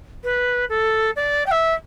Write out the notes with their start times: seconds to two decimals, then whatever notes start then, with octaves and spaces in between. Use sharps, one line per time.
0.23 B4
0.69 A4
1.16 D5
1.46 G5
1.51 E5